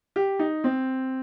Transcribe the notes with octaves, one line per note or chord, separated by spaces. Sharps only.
G4
D#4
C4